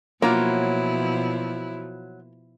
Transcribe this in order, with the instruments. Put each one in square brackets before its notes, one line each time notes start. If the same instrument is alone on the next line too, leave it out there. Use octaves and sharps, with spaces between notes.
[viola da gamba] B2 F3 [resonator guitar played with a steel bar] F#3 F4 C#5 [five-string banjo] A#3 [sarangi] E4